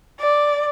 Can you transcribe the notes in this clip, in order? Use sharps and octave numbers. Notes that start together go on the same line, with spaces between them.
D5